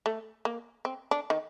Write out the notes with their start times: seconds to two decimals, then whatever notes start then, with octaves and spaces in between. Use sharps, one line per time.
0.06 A3
0.45 A#3
0.85 C4
1.11 D4
1.30 D#3